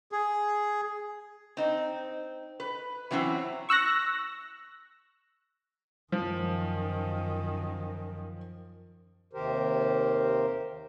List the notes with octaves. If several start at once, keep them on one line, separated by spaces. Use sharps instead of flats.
G#4
C4 D#4
B4
E3 F#3 C4 C#4 E4
C#6 E6 F#6 A#6
F#2 D#3 F3
D#2 C3 D#3 G4 A#4 C5